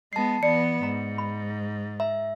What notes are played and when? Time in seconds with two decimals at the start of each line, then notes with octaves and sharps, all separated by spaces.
0.13 G#3 B3 A5 C7
0.43 E3 B3 D5 C#7
0.83 G#2 A#5
1.18 B5
2.00 E5 A#5